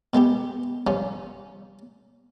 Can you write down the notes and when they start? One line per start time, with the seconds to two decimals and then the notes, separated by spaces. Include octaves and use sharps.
0.14 B2 G#3 B3 G4
0.87 G2 F3 C#4